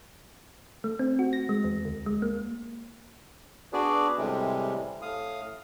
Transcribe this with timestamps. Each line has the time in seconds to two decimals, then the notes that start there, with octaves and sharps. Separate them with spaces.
0.84 A3
0.99 C4
1.19 F#4
1.33 A#6
1.49 G#3
1.64 E2
1.85 D2
2.06 G#3
2.22 A#3
3.73 B3 D4 F#4 G#4 B4 D5
4.18 A2 C3 E3 G3 G#3
5.02 A2 F5 D#6